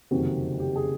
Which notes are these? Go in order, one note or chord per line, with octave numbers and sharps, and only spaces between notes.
F#1 F2 C3 D#3 F#4
G4
G#4